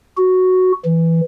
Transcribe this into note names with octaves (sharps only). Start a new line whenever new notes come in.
F#4
E3